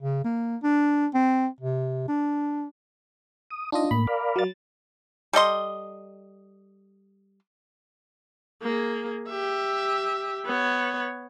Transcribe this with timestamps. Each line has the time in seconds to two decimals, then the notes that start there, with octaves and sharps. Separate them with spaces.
0.01 C#3
0.24 A#3
0.63 D4
1.14 C4
1.60 C3
2.08 D4
3.51 D#6
3.72 D4 D#4 F4 D#5
3.91 A2 A#3 B5
4.07 A#4 D5 F5
4.36 F#3 A6
5.33 G3 A4 D#5 C6
8.62 A#3 G#4
9.29 G4 E5
10.46 B3 C#5